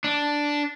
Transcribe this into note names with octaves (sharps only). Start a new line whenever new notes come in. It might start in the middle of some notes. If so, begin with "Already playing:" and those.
D4